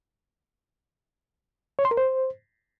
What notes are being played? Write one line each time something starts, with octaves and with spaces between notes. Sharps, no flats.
C#5
C6
A#4
C5